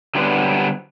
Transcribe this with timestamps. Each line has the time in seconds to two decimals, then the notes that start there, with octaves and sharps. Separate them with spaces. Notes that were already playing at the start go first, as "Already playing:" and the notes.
0.15 D3 F#3 G3 B3 C4 D4